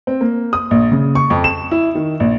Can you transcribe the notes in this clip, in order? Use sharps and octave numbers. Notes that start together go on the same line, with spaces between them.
C4
A#3
D#6
A#1
C#3
C#6
F2
E7
E4
D#3
A#1